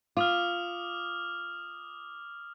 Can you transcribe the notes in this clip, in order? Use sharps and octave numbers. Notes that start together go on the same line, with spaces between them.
F4 D6 D#6 F6